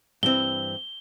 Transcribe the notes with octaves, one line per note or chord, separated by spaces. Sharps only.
G2 E3 C4 G7